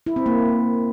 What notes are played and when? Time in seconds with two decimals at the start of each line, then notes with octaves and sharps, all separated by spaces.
0.06 E4
0.16 C4
0.26 A#3